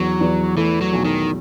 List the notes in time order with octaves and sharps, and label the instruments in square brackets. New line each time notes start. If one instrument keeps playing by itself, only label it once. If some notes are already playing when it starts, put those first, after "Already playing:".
Already playing: [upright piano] E2 [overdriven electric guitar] F#3
[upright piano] E2
[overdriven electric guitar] E3 [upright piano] A3
[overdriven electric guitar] F#3
[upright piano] B1
[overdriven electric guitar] D#3